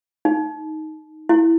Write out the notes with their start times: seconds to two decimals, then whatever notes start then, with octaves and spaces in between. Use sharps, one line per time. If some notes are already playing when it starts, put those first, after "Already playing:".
0.25 D#4
1.29 E4